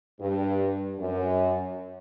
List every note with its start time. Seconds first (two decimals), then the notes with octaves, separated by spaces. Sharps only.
0.20 G2
0.99 F#2